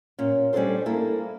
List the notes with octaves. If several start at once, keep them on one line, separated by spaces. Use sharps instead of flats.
A#2 C#4
G3 C#4 D4 A4 C5
A#3 E4 A4